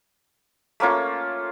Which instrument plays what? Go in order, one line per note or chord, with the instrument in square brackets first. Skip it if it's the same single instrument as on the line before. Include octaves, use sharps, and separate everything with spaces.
[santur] A3 A#3 C#4 F4